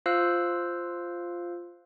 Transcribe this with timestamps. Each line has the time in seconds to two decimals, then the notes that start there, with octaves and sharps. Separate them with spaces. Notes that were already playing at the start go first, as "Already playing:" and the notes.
0.06 F4 C5 F5 E6 F#6